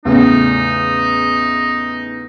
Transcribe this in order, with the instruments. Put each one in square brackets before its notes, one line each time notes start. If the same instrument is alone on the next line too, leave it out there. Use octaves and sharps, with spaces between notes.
[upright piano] E2 A2 C#3 [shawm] D#4